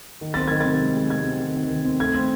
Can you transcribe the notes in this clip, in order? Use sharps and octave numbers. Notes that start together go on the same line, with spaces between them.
D#3
C4 A6
D#3 G#6
A6
C3
G#3
G#3
C3 G#6
C4
D#3
D#3
D#3
C4
A3 G#6
C4